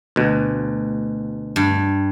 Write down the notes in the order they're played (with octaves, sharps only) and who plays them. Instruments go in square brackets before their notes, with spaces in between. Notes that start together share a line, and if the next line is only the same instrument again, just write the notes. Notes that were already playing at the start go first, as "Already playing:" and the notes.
[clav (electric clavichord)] D2 B2
[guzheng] G2